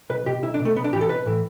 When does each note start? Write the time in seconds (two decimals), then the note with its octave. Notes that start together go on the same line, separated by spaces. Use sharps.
0.10 B1 B4
0.26 B2 G4
0.43 B1 E4
0.54 D4
0.60 B2
0.65 A3
0.76 B1 B3
0.84 D4
0.93 A2 E3 G4
1.01 A4
1.09 B1 B4
1.26 A2 E3